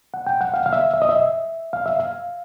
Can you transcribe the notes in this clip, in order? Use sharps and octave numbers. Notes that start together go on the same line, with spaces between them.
F#5
G5
F#5
F5
F5
E5
E5
D#5
E5
F5
E5
F5